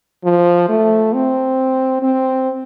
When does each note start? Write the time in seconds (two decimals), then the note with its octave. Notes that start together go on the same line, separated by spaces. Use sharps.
0.25 F3
0.69 A3
1.14 C4
2.03 C4